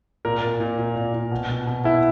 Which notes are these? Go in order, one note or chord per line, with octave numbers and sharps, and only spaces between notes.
A#2 A#4
A#2
A#2
A#2
A#2
A#2
B2
B2
B2
B2 E4